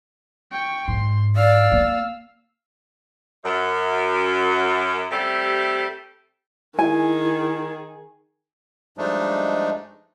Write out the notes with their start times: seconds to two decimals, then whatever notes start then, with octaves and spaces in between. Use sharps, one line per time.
0.51 G5 C#6
0.88 G#2 C6
1.36 D5 F5 E6
1.72 A#3
3.44 F#2
5.11 C3 G3 A3 G4 E5
6.79 D#3 E4 G#4 G#5
8.98 G2 F3 G#3 A3 D4 D#4